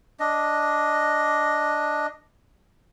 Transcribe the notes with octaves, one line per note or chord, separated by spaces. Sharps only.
D4 D#5